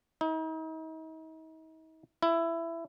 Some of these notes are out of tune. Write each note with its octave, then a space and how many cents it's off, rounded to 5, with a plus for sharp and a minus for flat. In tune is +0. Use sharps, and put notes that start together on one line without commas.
D#4 +40
E4 +15